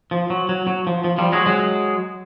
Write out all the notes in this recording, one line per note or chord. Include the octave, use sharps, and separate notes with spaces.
F3
F#3
F#3
F#3
F3
F3
F3 G3
F#3 G#3
F#3 G#3